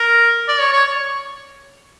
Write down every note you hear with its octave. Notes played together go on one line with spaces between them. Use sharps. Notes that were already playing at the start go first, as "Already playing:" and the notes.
Already playing: A#4
D5
C#5
C#5